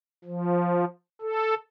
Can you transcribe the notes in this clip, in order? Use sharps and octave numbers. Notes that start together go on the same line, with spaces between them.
F3
A4